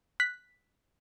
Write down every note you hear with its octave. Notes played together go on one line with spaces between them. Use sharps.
F#6 B6